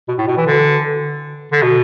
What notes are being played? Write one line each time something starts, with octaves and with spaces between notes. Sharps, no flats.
B2
A2
B2
E3
D3
D3
B2